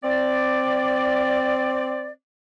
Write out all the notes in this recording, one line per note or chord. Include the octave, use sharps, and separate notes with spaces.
C4 D5